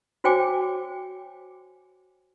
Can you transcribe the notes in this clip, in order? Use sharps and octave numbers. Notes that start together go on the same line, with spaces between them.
F#4 C5 C#5 G5 G#5 D6